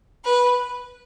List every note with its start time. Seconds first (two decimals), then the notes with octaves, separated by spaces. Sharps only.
0.24 B4